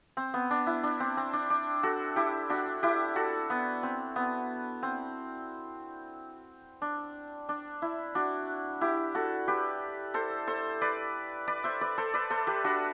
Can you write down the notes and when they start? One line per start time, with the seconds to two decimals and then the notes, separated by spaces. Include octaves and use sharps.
0.17 C4
0.34 B3
0.51 D4
0.67 E4
0.83 D4
1.00 C4
1.17 C4
1.33 D4
1.50 D4
1.83 F#4 A4
2.16 E4 G4
2.50 D4 F#4
2.83 E4 G4
3.16 F#4 A4
3.50 B3
3.83 C4
4.16 B3
4.83 C4
6.82 D4
7.49 D4
7.82 E4
8.15 D4 F#4
8.81 E4 G4
9.15 F#4 A4
9.48 G4 B4
10.14 A4 C5
10.47 A4 C5
10.81 B4 D5
11.47 B4 D5
11.64 C5 E5
11.81 B4 D5
11.98 A4 C5
12.14 B4 D5
12.30 A4 C5
12.47 G4 B4
12.64 D4 F#4